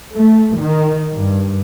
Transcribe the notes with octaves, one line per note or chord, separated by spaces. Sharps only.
A3
D#3
G2